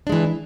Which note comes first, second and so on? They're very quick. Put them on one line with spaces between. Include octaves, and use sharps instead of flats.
D4 G#3 E3